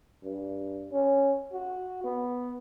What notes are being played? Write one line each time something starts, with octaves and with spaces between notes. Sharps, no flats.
G2
C#4
F#4
B3